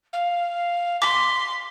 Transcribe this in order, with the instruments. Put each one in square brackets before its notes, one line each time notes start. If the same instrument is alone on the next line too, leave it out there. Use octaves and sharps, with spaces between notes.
[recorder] F5
[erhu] C6 [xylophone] D6 [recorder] B6